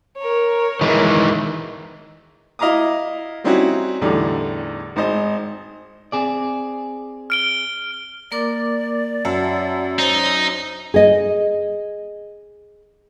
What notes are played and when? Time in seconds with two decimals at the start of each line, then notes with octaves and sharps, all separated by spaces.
0.18 A#4 C#5
0.81 D#3 E3 G#3
2.59 E4 D#5 F5 A#5 D6 D#6
3.44 G3 C4 C#4 D#4 E4 F#4
4.01 E2 A2 D3 G3 D#4
4.96 G#1 D#4 C5 D#5
6.12 C4 G#4 D5
7.30 F6 D7 G7
8.32 A#3 A#4 D5 D6
9.25 F#2 E5 F#5 A5
9.99 D#4 C5 C#5
10.94 G#4 D#5